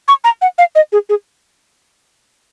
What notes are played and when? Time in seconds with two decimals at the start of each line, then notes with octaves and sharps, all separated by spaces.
0.08 C#6
0.24 A#5
0.42 F#5
0.58 F5
0.75 D#5
0.92 G#4
1.09 G#4